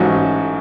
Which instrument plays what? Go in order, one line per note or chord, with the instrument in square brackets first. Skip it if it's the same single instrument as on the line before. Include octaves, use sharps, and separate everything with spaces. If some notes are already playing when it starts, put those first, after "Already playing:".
Already playing: [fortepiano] A1 G#2 F#3 C#4 F#4